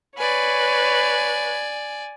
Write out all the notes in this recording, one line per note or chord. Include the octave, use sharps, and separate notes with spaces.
B4 C#5 D5 G#5